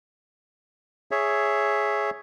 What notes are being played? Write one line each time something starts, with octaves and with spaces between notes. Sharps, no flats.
G#4 C#5 E5